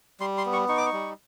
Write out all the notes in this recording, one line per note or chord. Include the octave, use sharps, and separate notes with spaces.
G3 C6
C6
B3
C#6
D#4 C#6
D6
C#6
G3